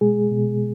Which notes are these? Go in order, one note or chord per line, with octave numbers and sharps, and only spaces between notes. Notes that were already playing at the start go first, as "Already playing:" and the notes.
B2 G#3 G#4
B2